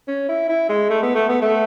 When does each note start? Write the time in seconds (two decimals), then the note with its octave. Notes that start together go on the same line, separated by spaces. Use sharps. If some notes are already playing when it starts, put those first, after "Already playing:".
0.08 C#4
0.29 E4
0.49 E4
0.69 G#3
0.90 A3
1.03 B3
1.15 A3
1.29 B3
1.42 A3